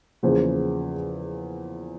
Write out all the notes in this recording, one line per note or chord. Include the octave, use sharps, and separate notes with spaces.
E2 C#3 F3 A#3 C5